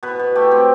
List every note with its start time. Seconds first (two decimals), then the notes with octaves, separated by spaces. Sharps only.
0.03 B2 B4
0.19 B2
0.35 A3 G4
0.51 C4